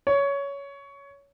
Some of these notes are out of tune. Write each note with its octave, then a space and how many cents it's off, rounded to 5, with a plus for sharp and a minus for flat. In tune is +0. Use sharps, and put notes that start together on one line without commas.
C#5 +15